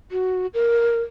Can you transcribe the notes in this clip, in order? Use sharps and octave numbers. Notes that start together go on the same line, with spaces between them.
F#4
A#4